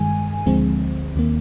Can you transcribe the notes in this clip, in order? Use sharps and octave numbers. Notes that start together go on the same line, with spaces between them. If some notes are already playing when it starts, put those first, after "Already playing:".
Already playing: G2 D#3 G#3 G#5
D2 D3 F3 G#3 C4
D#2 D#3 A#3